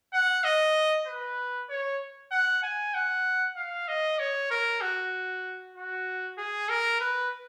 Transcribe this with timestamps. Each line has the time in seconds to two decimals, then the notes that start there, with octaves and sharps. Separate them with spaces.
0.13 F#5
0.44 D#5
1.07 B4
1.70 C#5
2.31 F#5
2.63 G#5
2.94 F#5
3.57 F5
3.88 D#5
4.19 C#5
4.51 A#4
4.81 F#4
5.75 F#4
6.38 G#4
6.69 A#4
7.00 B4